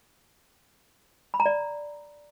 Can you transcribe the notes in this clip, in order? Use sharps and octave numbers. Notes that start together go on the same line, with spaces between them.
B5
A#5
D5